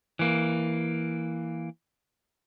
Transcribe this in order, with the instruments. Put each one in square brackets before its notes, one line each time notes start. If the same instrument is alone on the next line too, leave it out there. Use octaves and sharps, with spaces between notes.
[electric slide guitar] E3 A#3